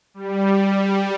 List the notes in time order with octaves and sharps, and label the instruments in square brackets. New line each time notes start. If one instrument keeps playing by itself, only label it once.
[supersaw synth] G3